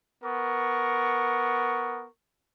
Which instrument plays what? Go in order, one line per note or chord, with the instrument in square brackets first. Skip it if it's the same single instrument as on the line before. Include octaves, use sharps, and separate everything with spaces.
[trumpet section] B3 A#4 C#6